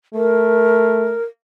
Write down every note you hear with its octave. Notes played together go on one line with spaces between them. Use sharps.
A3 A#4